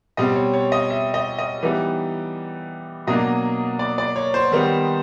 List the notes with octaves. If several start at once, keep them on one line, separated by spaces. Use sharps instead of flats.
B2 G3 C4 D#5
C#5
C#5
D#5
E5
D#5
D#5
E3 G3 B3 D#4
B2 F#3 A#3 D4 D#5
D5
D5
C#5
C5
D#3 G3 B3 D#4